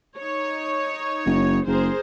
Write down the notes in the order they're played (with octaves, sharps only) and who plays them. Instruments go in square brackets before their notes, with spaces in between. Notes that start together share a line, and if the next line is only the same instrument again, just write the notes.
[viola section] D#4 C#5
[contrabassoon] F#1
[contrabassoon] F#1 [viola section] G#4 A#4 C5